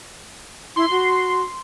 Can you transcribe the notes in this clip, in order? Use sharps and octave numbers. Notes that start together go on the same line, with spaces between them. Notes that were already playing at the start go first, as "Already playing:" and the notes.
E4 C6
F#4